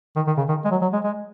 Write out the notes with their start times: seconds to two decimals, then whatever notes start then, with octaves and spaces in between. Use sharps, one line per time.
0.16 D#3
0.27 D#3
0.37 C#3
0.48 D#3
0.65 G#3
0.71 F#3
0.82 F#3
0.93 G#3
1.04 G#3